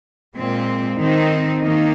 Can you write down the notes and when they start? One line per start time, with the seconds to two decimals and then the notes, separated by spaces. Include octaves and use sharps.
0.36 A#2 G#3 C4
0.99 D#3 C4 D#4
1.62 D#3 A#3 D#4